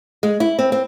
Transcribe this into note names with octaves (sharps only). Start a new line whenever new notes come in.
G#3
E4
C4
C4